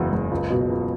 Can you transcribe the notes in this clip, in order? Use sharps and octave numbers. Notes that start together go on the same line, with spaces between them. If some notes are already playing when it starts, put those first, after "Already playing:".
Already playing: F#1 E2 C#3 F#4
F#1
C#2
B2
C#2